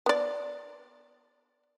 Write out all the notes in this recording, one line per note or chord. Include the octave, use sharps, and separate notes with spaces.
B3 D5